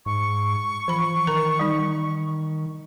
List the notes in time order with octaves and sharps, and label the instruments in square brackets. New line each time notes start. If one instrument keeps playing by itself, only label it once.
[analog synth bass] G#2 [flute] C#6
[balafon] E3 B5 [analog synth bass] F3
[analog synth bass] D#3 [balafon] A#4 A#5
[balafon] G3 D#4